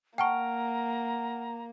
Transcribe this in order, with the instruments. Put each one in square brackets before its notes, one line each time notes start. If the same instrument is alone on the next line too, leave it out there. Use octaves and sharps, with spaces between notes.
[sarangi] A#3 [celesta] F#5 F6 D7 [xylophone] G5 A5 C#6 [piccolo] A#5